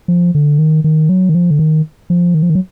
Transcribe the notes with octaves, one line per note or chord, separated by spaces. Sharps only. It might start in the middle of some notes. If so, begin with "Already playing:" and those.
F3
D3
D#3
D#3
F#3
D#3
F3
D3
D#3
F3
D#3
F3
D#3
F#3